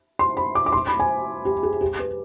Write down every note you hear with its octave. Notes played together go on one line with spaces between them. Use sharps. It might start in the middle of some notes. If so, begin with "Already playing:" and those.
C6
B5
D6
D6
C6
B5
G#5
G4
G#4
G4
B4